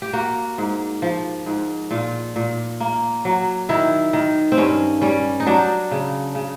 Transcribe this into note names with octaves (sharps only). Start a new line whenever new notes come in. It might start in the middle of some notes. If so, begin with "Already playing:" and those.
G4
A#3 F#4
G#2
F3
G#2
A#2 F4
A#2
A#3
F#3
D#3 E4
D#3
C4
G2 C#4
G3 C#4
D#4
F#3 D4
C#3
C#3